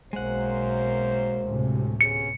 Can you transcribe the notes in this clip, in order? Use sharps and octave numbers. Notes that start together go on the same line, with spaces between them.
B1 F#2 G#3 A#3 C5 F#5
D2 A2 C3
B3 C#4 G#4 C#7